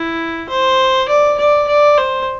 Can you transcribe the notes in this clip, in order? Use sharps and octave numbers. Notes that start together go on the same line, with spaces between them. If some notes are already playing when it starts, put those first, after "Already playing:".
Already playing: E4
C5
D5
D5
D5
C5